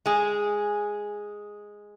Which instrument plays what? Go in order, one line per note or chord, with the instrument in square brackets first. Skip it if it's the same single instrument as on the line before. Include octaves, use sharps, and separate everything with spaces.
[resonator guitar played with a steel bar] G#3 G#4